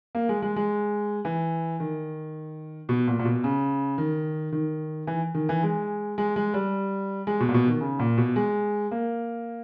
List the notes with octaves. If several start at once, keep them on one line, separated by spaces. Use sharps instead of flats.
A#3
G#3
G#3
G#3
E3
D#3
B2
A#2
A#2
B2
C#3
D#3
D#3
E3
D#3
E3
G#3
G#3
G#3
G3
G#3
B2
A#2
B2
D#3
C#3
A#2
B2
G#3
A#3